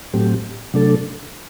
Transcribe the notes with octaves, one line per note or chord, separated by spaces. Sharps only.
A2 F#3 A3 C4 G4
C3 F#3 A3 D4 A4